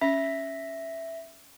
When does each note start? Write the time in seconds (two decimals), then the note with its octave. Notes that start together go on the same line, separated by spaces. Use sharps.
0.01 C#4 E5 A#6